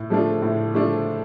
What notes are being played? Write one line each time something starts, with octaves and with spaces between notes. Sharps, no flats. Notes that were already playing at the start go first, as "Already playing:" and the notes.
Already playing: A2
F3 A3 D4 F4
A2
F3 A3 D4 F4